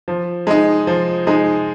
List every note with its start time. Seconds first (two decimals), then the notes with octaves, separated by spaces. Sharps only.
0.08 F3
0.47 G#3 D#4
0.87 F3
1.27 G#3 D#4